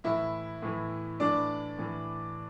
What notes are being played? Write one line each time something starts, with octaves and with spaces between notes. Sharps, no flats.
A2 E3 E4 E5
A2 E3
A2 E3 D4 D5
A2 E3